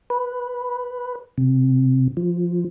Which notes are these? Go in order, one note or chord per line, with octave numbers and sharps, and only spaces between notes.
B4
C3
F3